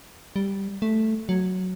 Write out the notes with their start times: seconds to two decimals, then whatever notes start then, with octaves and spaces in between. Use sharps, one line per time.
0.36 G3
0.82 A3
1.29 F#3